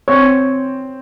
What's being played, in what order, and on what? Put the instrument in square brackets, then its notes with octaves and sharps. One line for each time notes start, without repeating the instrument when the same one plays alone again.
[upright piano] C4 [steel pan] C#5